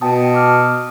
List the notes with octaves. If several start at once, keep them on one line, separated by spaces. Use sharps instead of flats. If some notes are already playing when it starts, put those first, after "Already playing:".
B2 G5 A5 D#6
D6 D#6 F6